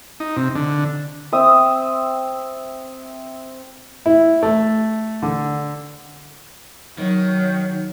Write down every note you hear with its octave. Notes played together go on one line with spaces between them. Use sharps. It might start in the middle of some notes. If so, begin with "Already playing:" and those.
D#4
C3
D3
C4 E5 D#6
E4
A3
D3
D#3 F#3